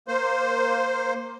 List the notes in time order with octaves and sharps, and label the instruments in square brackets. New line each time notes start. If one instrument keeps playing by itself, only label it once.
[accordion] A#3 C5